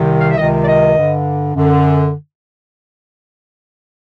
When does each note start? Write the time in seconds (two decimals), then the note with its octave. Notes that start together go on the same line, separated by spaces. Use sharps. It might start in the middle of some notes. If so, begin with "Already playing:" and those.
Already playing: C2 C3 D#3
0.20 F5
0.29 E5
0.37 C#2 C3 D#3 D#5
0.63 D5
0.66 D#5
0.96 G2 D3
1.54 F#2 D3